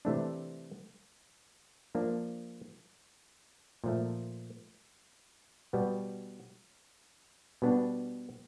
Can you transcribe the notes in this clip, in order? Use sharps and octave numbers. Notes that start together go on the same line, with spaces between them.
C3 E3 A3 D4
F3 A#3 D4
A#2 F3 A3
B2 G3 B3
B2 G3 B3 D4